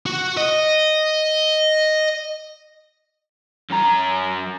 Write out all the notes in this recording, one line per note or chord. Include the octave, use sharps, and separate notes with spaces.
F#4
D#5
F#2 A#5